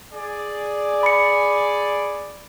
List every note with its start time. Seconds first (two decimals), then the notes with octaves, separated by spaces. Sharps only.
0.13 G#4 D5
1.03 B5 C#7